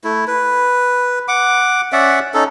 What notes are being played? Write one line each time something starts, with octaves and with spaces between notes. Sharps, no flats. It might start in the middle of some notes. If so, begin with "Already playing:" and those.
A3 E4
B4
F#5 D6
C#4 D5 E5 F#5
C#4 D#4 A4